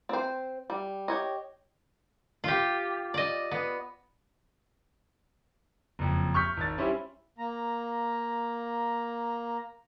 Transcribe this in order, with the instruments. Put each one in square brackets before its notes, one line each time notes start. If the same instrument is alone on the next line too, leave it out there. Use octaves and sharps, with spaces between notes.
[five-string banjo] C4 C5
G3
G4 C#5 D#5
[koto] F4 G4
D5 D#5
B3
[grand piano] F#1 F2
C#6 F6 G6 B6
G#1 A6
G3 C#4 E4 G4 C5
[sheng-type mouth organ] A#3 A#5